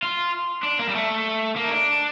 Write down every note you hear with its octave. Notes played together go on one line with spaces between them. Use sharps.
F4
D4
A#3
G3
A3
A#3
D#4
D4